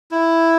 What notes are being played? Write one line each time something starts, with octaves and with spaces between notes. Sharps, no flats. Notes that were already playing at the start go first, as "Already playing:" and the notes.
E4